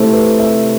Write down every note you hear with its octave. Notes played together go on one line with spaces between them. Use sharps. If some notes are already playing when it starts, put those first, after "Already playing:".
Already playing: C3 A3 E4
B4
E5